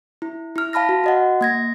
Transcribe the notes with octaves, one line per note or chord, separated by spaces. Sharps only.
E4
E4 F6
F5 A5 B5 F6 A#6
F#4
F#4 D#5 F#5
A#3 G#6 A#6